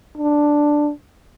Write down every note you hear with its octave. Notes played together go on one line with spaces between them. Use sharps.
D4